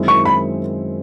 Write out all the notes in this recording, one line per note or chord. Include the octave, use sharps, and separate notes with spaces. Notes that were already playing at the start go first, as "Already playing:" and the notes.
Already playing: F#2 D#3 G#3 C4 E4
C#6
B5